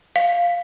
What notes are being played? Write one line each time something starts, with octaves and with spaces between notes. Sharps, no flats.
F5